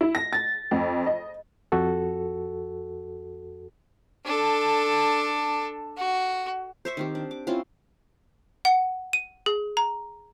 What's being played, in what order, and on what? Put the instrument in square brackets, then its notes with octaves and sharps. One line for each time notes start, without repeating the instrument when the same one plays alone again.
[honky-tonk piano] E4
A#6
A6
F2
D#5
[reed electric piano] F2 F#4 A4
[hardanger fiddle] D4 A4
F#4
[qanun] C5 E5 C#6
D#3 C4 G4
D4
D6
C4 C#4 E4 F4
[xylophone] F#5
D#7
G#4
A#5